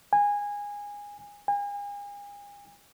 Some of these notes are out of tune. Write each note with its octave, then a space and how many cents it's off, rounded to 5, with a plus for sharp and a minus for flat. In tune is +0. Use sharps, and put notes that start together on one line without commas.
G#5 -20
G#5 -40